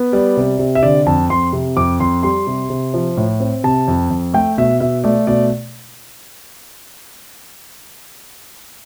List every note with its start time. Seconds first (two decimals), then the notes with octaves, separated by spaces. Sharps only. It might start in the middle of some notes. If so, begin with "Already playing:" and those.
Already playing: B3
0.13 G3 D5
0.37 C3
0.59 C3
0.75 E5
0.83 D3 D5
1.06 F2 A5
1.30 F2 C6
1.53 C3
1.77 F2 D6
2.00 F2 C6
2.23 G3 C6
2.47 C3
2.70 C3
2.94 F3
3.17 A2
3.40 C4
3.64 C3 A5
3.88 F2
4.10 F2
4.34 A3 G5
4.58 B2 E5
4.80 B2 E5
5.04 A3 D5
5.27 B2 D5